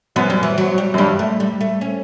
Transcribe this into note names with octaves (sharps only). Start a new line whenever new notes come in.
F#2 B3
G3
E3
F#3
G3
F#2
G2 G3
A3
G3
A3
C#4